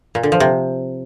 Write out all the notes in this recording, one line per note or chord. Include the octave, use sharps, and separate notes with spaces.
A#2
D3
F3
C3